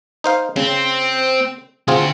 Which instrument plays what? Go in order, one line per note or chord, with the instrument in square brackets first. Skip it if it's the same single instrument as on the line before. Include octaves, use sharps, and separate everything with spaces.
[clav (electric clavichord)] D#4 C5 F5
[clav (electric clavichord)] C#3 [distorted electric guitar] C4
[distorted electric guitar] D3 F#4 [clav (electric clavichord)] C4 F4 G#4